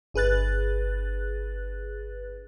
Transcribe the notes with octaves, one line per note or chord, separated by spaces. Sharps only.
G1 G#4 B4 F#6 A6